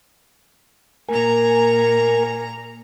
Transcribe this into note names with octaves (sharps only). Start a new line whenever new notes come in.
A#2 A#4 G#5 A#5